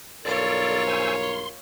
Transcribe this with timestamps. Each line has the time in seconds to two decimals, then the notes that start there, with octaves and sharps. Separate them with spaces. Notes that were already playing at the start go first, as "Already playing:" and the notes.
0.25 B1 G2 F4 A4 A#4 C#5 D5
0.87 C5 G#5 E6
1.23 C6